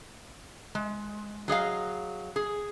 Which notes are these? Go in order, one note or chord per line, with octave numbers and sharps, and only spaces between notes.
G#3
F#3 G#4 D#5 F5
G#4